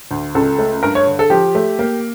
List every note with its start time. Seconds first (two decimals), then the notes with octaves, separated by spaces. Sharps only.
0.11 D2
0.35 C#2 A4
0.59 A3
0.83 G2 A#4
0.95 C#5
1.06 D3
1.19 A4
1.30 F3 G4
1.55 A3
1.79 A#3